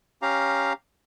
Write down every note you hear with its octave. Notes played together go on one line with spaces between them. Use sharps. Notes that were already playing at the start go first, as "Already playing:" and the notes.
C#4 G4 F5 A#5